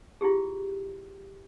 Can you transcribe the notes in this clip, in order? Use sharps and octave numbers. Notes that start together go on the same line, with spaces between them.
E4 F4 G4 G#4